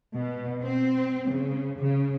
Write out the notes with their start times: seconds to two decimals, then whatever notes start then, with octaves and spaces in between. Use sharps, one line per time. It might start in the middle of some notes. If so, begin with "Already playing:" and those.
0.15 B2
0.63 C4
1.30 C#3
1.80 C#3